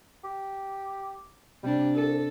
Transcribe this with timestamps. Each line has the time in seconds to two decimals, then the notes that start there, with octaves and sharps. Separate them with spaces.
0.24 G4
1.63 C3 G3 D4
1.95 C2 A4